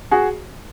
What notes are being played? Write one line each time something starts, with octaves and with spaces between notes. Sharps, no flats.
F#4 G#4